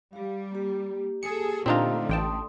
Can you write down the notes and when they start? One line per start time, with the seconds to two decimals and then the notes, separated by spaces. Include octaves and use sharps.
0.13 G3 G4 F5
0.52 A#3 G4
1.23 G#4 A4 C#7
1.66 A#2 D3 A3 C4 D4 D#4 F4 A#5
2.09 A1 G5 A5 C6 D#6